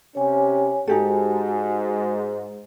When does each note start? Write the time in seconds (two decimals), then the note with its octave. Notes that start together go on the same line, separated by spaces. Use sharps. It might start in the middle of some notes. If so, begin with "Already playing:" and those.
0.15 C3 C#4 G4 C#5 G#5
0.88 G#2 D#4 F#4 G4 A4 G#5